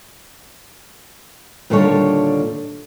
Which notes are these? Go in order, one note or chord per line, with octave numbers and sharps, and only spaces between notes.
D#2 A#2 D3 G3 A4 C#5